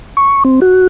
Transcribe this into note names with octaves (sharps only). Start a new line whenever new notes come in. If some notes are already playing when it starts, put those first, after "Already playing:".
C#6
C4
F#4